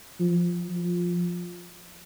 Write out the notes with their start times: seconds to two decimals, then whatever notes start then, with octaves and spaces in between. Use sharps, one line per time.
0.20 F3
0.69 F3